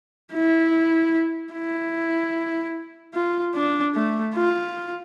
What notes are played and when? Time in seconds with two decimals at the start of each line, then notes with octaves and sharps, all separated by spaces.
0.33 E4
1.53 E4
3.14 F4
3.55 D4
3.95 A3
4.35 F4